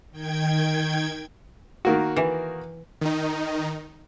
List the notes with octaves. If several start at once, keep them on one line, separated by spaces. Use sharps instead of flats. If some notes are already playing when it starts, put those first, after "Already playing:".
D#3 G5 G#6
D#3 A#3 F#4
E3
D#3 D#4